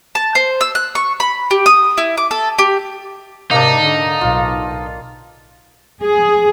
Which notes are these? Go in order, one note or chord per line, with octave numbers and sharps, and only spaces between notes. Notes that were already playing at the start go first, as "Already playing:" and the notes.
A5
C5
E6
F#6
C#6
B5
G4
D#6
E4
D6
A4
G4
G#2 C3 A#3 D4 D#4
D3
B1 A2 F4
G#4